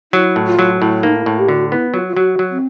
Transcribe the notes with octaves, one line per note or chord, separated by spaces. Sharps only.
F#3 E4
A2
F4
F#3
A2 E4
A#3 D#4
E4
A2
G4
D3 F#4
B3 E4
F#3 F4
F4
F#3 F#4
F#3
C4